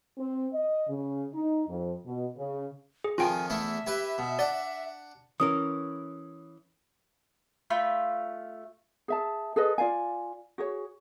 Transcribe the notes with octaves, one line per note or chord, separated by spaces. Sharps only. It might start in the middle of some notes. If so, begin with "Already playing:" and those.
C4
D#5
C#3
D#4
F2
B2
C#3
G#4
F2 D#3 F3 F4 G5 G#5
E2 A3 E4 E5
E4 G4 B4
B2
D4 D5 F#5
E3 C#4 A#4 D#6
A3 F4 B5 G6
G#4 E5 A5
G#4 A4 B4 D#5
F4 D5 F5 G#5
F#4 G#4 C#5